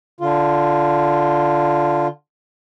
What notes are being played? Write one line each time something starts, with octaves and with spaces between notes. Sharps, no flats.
D3 F4